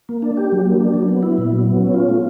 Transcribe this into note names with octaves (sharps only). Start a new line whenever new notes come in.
A#3
D4
G4
F#3
A#3
D4
F#3
B3
E4
A#2
F#3
B3
C#4
F4
A3